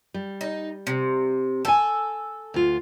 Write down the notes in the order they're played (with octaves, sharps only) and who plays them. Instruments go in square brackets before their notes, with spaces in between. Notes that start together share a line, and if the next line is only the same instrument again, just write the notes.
[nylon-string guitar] G3
[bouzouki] D#4
C3
[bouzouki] A4 [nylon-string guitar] G5 G#5
[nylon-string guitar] D2 F4